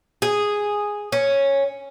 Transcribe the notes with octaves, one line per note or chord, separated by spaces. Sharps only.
G#4
C#4